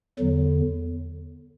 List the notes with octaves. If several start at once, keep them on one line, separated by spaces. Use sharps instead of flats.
E2 D3 F#3